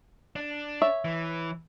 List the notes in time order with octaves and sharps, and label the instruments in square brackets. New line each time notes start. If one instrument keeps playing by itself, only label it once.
[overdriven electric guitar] D4
[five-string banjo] C#5 E5
[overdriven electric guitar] E3